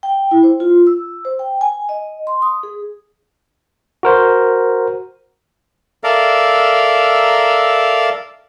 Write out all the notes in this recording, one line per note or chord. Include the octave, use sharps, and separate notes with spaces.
G5
E4
C5
F4
E6
C5
G5
G#5
D#5
C6
D#6
G#4
F#4 A#4 C5
A4 A#4 D5 E5 F5 A#5